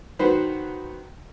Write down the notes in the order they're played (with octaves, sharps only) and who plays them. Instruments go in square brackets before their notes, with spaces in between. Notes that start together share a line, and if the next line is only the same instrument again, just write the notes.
[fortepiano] D#3 F#3 F#4 B4 C5